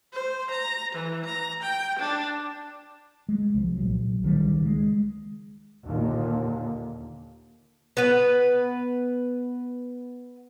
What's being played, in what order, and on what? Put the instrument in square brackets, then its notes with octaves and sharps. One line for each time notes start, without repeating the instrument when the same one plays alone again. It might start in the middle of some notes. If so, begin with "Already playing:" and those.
[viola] C5
A#5
E3
A#5
G5
D4
[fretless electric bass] G#3
C2 F3
A#1 F#3
C#2 D#3 F#3 G3
G#3
[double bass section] D#2 A#2 D3
[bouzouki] B3 B4